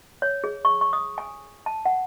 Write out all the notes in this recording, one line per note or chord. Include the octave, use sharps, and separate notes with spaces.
C#5
G#4
C#6
C#6
D#6
G#5
A5
F#5